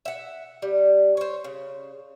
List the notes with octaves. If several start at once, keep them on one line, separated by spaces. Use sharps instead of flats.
E5 F#5
G3
C5 C#5
C#3